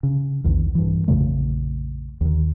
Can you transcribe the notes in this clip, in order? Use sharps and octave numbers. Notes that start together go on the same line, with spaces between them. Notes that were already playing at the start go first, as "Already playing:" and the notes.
C#3
A#1 E2 D#3
G2 E3
A#1 F2 C#3 A3
D#2 D#3